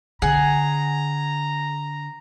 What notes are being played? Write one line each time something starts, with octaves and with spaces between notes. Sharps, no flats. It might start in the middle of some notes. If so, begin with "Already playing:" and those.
D3 G#4 F#5 A#5